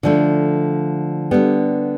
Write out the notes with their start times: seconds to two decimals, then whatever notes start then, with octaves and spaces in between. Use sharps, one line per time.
0.03 D3 F3 A3
1.31 D3 G3 B3